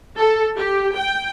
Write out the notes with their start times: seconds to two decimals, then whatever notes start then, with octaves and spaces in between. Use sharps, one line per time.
0.17 A4
0.58 G4
0.96 G5